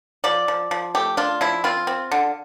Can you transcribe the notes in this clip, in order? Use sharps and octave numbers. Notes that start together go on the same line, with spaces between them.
F3 D5
F3
F3
A3 G4
D4 F4
F3 E4
C4 F4
C4
D3